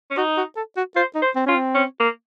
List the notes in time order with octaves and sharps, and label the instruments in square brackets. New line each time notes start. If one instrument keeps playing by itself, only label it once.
[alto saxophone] C#4
[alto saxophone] D#4 [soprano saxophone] F#4
[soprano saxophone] F#4
A4
F#4
[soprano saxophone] F4 [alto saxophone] C5
[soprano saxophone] D#4
[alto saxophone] C5
[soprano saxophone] C4
[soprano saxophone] C#4 [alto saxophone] F4
[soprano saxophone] C4
[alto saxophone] C#4
A#3